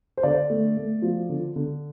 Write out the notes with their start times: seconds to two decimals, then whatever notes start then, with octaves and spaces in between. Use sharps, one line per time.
0.17 C5
0.23 D3 D5
0.50 A3
0.77 A3
1.02 F3
1.29 D3
1.56 D3